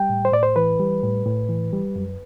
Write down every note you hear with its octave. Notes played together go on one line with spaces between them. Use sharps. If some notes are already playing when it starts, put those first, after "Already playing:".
Already playing: G3 G5
A2
C5
A2 D5
C5
E3 B4
G3
A2
A2
E3
G3
F#2